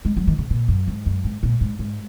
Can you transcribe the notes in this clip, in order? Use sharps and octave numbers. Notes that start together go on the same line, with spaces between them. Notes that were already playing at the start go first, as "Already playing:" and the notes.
G#3
F#3
D#3
C#3
A#2
F#2
G#2
F#2
G#2
A#2
G#2
G#2